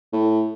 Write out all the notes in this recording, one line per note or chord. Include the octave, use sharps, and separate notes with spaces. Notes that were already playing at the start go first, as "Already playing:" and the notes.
A2